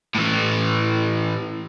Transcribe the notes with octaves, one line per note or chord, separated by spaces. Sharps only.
A2 E3